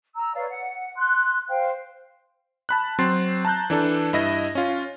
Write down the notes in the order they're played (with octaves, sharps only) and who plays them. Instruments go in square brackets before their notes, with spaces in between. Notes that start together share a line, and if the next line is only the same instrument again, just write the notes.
[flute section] A#5 E6
B4 C#5 D5 F5
F#5
C6 F#6
C5 F5 G5
[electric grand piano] A5 B5 F#6
F#3 C4 C6 A6 C7
A5 A#5 F#6 G6
E3 D4 A4
G2 E4 D#5 A#6
C#4 F4